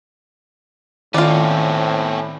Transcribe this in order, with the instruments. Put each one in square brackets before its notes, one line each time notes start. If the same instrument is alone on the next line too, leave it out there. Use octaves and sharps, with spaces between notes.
[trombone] A2 [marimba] D#3 [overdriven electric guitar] C4 C#4 [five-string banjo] F4 D5